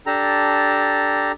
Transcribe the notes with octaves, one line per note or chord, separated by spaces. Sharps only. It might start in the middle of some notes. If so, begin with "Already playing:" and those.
D4 G4 A4 A#5